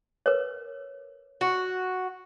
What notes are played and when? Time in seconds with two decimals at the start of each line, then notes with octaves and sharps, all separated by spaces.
0.26 A#4 B4 C#5
1.41 F#4